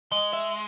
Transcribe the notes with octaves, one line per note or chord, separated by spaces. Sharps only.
G#3 D#5
E5